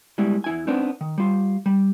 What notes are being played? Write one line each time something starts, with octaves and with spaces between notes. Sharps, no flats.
G3 G#3 B3 E4
E2 E4 G#5
B3 C4 D4 D#4
D#3
G3 F4
G3